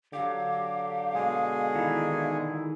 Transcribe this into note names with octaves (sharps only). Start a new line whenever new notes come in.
D3 F#3 G4 F5
B2 G#3 G#4
D#3 E3 E4